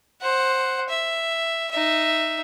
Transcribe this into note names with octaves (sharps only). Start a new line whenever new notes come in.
C5 F#5
E5
D#4 E5